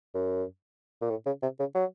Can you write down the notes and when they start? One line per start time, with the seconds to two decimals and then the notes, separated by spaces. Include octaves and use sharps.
0.15 F#2
1.02 A#2
1.10 A2
1.26 C#3
1.42 C3
1.59 C#3
1.75 F#3